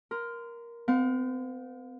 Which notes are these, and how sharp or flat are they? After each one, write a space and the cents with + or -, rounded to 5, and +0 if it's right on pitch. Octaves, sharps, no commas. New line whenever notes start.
A#4 +10 C6 -25
C4 -40 F5 +35